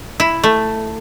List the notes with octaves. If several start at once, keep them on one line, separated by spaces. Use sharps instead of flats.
E4
A3